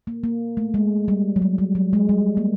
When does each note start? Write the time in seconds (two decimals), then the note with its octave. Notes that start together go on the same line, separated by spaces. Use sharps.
0.07 A#3
0.24 A#3
0.57 A3
0.74 G#3
1.08 G3
1.36 F#3
1.42 G3
1.58 G3
1.75 F#3
1.93 G#3
2.09 G3
2.37 A#3